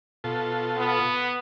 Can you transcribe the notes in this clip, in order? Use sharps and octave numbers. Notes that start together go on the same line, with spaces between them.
B2 F4 A4
B3